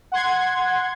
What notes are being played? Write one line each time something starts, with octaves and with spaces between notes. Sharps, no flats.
F#5 C6 G#6